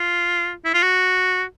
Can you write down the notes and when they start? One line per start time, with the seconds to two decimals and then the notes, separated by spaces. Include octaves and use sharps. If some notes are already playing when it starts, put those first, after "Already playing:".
Already playing: F4
0.65 E4
0.74 F4
0.83 F#4